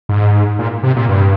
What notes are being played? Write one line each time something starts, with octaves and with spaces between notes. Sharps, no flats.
G#2
A#2
C3
A#2
G2